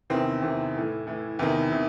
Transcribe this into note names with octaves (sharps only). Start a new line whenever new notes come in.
E2 C3 D#3 C4
E2 C3 D#3
A2 E3
A2 E3
E2 C3 D#3
C3 D#3